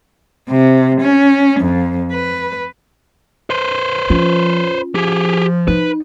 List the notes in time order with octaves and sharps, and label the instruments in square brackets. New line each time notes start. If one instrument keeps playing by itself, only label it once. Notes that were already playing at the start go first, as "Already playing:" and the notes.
[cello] C3
C#4
F2
B4
[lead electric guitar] B4 C5
[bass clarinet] F3 [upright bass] C#4 F4
[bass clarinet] F3 [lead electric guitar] G4 G#4
[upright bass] D#4 [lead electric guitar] B4